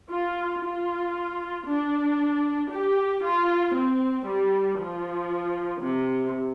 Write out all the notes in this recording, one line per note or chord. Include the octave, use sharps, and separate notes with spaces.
F4
F4
D4
G4
F4
C4
G3
F3
C3